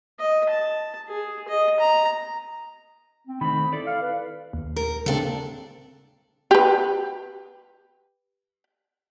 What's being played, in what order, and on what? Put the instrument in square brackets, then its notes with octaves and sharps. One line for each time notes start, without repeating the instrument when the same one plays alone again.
[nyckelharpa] D#5
A5
G#4
D#5
A#5
[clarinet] C4
[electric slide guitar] D#3 A3 C4 [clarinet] B5
[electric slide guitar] E4 A4 D5
[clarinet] F5
B4
[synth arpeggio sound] D#2
[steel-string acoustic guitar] A#4
[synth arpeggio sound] C#3 A#3 C4 [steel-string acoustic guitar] D4 A4
[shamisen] G4 B4